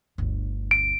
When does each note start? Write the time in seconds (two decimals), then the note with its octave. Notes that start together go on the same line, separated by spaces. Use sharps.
0.18 G1 D2
0.71 D7